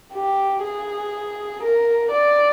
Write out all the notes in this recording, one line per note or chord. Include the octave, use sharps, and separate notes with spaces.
G4
G#4
A#4
D5